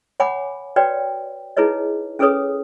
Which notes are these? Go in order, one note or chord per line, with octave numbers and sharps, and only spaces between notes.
C#5 F#5 G#5 B5 D6
F#4 B4 C#5 D5 G5
D#4 E4 G#4 B4 C#5 D#5
C#4 G#4 A4 B4 C#5 D#6